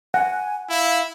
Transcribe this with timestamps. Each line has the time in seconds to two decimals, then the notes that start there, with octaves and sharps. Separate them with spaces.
0.14 F#5 G#5
0.69 E4 F5